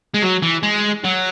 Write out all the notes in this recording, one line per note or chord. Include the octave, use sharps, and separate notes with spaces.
G#3
F#3
E3
G#3
F#3